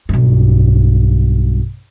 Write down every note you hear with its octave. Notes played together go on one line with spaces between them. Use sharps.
B1 G2